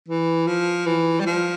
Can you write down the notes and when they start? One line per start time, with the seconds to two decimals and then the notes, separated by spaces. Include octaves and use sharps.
0.08 E3
0.47 F3
0.86 E3
1.20 G3
1.26 F3